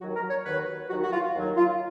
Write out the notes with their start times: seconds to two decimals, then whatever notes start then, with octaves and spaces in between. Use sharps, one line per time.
0.01 D#2 D#3 F#3 F#4
0.16 A#4
0.30 C#5
0.45 D#2 D#3 F#3 B4
0.90 D#2 D#3 F#3 F#4
1.03 F#4
1.12 F4
1.35 D#2 D#3 F#3
1.57 F4